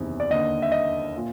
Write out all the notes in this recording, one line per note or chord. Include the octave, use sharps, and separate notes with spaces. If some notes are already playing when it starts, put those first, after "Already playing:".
Already playing: F#1 E2 C3 D#3
D5
D#2 D3 D#5
E5
D#5
A#2